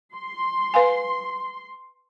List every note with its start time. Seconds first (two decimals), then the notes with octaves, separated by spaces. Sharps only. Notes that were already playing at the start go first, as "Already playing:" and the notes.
0.15 C6
0.74 B4 F5 G#5